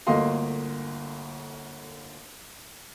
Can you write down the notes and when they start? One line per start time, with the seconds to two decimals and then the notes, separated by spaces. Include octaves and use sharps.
0.07 G1 D2 A#3 D#5 F5 C6